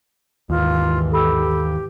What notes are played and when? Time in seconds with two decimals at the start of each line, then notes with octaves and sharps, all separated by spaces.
0.50 G#1 D#2 E3 F4
1.12 G4 A4 B5 E6